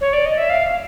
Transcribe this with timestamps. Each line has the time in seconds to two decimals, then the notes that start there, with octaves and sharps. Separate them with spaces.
0.01 C#5
0.13 D5
0.26 D#5
0.37 E5
0.50 F5